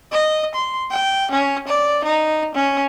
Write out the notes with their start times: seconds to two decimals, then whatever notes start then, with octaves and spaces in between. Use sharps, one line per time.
0.12 D#5
0.55 C6
0.91 G5
1.32 C#4
1.68 D5
2.04 D#4
2.55 C#4